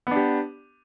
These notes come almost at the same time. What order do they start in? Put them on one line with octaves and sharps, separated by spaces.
B3 D4 G4